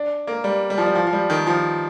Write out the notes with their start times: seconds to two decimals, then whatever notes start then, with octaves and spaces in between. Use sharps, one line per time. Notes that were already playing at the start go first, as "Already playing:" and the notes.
Already playing: D4
0.27 A#3
0.44 G3
0.70 G3
0.78 F3
0.86 G3
0.95 F3
1.07 F3
1.13 G3
1.30 D#3
1.47 F3